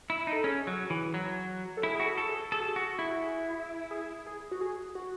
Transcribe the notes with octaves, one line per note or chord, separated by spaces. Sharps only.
E4
D#4
A4
C#4 G#4
F#3
E3
F#3
A4
E4 G#4
G#4
F#4
A4
A4
G#4
G#4 A4
F#4
G#4
F#4
E4
F#4
G#4
G#4
G#4
F#4
G#4
F#4